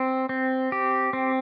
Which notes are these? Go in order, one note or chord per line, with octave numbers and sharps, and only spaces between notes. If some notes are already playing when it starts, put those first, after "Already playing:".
Already playing: C4
C4
G4
C4